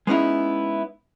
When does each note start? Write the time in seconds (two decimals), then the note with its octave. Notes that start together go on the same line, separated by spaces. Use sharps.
0.07 G#3 B3 C#4 D#4 E4